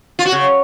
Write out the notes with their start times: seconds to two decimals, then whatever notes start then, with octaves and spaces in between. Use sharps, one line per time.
0.19 F4
0.26 F#4
0.32 C#3